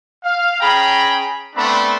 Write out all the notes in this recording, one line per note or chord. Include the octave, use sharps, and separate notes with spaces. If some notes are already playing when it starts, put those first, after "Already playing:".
F5
C#4 G#4 G5 A#5 B5
A3 B3 C4 D4 B5 C6